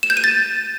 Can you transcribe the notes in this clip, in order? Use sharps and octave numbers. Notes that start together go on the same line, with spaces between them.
E7
G6
D#7
A6